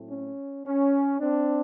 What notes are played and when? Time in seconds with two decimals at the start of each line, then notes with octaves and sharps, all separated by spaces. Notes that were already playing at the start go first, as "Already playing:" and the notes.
Already playing: A2 F#3 A3 C4
0.10 C#4
0.65 C#4
1.20 C4 D4